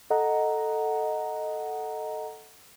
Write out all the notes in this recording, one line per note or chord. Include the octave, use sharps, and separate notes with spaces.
A4 D#5 F#5 A#5